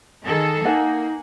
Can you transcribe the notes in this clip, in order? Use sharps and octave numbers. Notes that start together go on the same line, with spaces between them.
D#3 G#4 A4
A#3 D#4 F#5 G#5